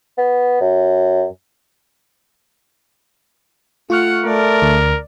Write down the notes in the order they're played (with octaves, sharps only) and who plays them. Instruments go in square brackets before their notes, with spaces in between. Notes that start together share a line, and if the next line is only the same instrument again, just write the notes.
[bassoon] B3
F#2
[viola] A3 F#5 [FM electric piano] F4 C#6 F6
[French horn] A3 [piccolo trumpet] A#4 [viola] D5
[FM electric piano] D2